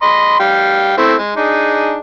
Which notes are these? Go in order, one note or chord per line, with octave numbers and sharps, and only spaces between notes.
D#5 B5 C6
G3 F5 G5
A3 C4 E4
G#3
D4 D#4 G#4